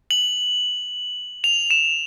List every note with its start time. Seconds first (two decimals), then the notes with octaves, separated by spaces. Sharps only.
0.11 F#7
1.44 F7
1.70 E7